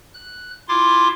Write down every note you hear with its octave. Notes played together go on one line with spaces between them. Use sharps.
F#6
E4 F4 C6 D6